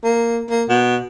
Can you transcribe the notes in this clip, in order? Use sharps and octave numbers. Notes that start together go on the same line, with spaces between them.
A#3
A#3
B2